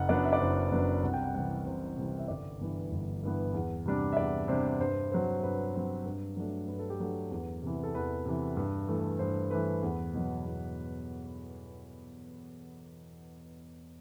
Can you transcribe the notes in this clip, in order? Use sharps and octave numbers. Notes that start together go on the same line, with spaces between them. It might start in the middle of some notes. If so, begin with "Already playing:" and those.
Already playing: F#1 F#5
F#2 F#3 B3 D4 D5
E5
D5
F#1 C5
F#2 F#3 B3 D4 B4
C2 F#5
G5
F#5
C3 E3 G3 C4 F#5
C2 C5
C3 E3 G3 C4
E5
G1 D5
G2 E3 B3
G1
G2 E3 B3
E2
C3 G3 D4
E5
E2 D5
C3 G3 D4 C5
G2 C5
F#3 C4 C5
G2 B4
F#3 C4
G2
F#3 A3 D4
G2 B4
A4
G4
F#3 A3 D4 A4
E2
C3 E3
A4
E2 B4
C3 E3
G2
E3 A3
G2 C5
E3 A3 B4
E2
B2 F#3
E2